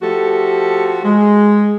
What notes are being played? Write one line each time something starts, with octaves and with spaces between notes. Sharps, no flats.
F3 A3 F#4 G4 A4
G#3